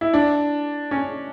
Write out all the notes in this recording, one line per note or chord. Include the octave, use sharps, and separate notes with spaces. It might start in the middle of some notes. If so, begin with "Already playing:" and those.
E4
D4
C#4